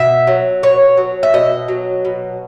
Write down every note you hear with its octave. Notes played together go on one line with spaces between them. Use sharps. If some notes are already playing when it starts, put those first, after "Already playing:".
Already playing: B2 E5
F#3
B2 C#5
F#3
E5
B2 D#5
F#3
B2